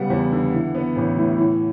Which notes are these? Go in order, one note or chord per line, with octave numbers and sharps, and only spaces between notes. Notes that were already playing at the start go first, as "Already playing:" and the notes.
Already playing: C#3 G3 B3 F#5
E2
D3
E3
B3
A1
A2
E3